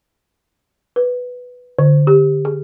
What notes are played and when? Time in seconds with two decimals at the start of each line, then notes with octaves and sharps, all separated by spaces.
0.96 B4
1.79 D3
2.07 G4
2.45 G#4